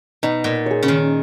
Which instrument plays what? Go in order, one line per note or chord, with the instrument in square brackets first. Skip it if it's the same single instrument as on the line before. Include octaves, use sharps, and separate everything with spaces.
[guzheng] B2 [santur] D#4
[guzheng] A#2
[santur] G#4 C#5
[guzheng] C#3
D#3